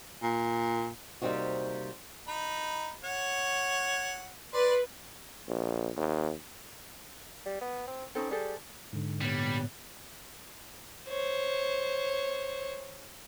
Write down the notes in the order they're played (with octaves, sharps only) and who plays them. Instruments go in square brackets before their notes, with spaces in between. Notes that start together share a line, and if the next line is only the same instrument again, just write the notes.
[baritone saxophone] A#2
[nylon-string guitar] C3 G3 A#3 C4 D#4 F#4
[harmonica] D#4 B5
C#5 F#5
[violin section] B4 [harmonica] D5 C6
[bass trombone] A#1
D#2
[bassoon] G3
B3
C4
[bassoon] C4 [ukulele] C#4 D#4 A4
[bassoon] G3 [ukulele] G#4 A4 C5
[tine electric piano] G#2 D3
[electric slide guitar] A#2 B3 C#5 [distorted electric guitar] G3
[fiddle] C5 C#5